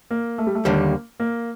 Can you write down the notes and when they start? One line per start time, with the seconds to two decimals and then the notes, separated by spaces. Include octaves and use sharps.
0.11 A#3
0.38 A3
0.47 G3
0.55 A3
0.65 D#2 D3 G3 A#3
1.20 A#3